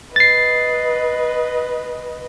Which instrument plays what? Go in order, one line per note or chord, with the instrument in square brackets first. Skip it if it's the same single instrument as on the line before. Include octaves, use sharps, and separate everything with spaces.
[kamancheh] B4 D#5 [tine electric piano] A6 C7